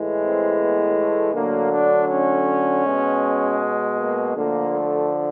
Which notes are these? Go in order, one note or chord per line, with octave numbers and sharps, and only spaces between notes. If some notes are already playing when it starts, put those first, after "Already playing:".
Already playing: A2 E3 G#3
C4
B3
A3
D3 F#3 A3 A#3
D4
C#4
B2 G#3
A#3
D3 F3 A3 A#3
A3